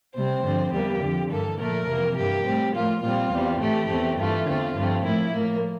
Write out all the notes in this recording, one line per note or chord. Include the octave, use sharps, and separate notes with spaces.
C3 G3 C4 C5
G2 D3 F3 C4
E2 E3 G3 A#3 G4
F2 D3 F3
G2 E3 A#3 A4
A#2 F3 A3 A#4
F2 C3 E3 A#3
G2 E3 A#3 G4
A2 G3 C4
A2 F3 A#3 F4
A#2 G3 C4 F4
E2 E3 G3 C4
A2 E3 A3 G4
E2 E3 A3 C4
G2 E3 A3 F4
E2 D3 A3 C4
G2 F3 A3 C4
A2 F3 A#3 E4
A2 F3 A#3